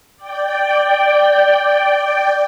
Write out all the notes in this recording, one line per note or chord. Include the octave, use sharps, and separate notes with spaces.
D5 G5